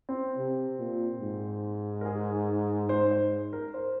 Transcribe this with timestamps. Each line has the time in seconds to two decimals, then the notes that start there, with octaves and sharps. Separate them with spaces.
0.09 C4
0.37 C3
0.79 A#2
1.20 G#2
2.01 A#4
2.05 G#4
2.89 C5
3.11 C5
3.53 A#4
3.74 C5